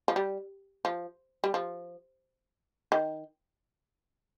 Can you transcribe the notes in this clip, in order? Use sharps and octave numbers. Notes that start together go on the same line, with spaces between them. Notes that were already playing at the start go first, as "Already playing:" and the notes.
F3
G3
F3
G3
F3
D#3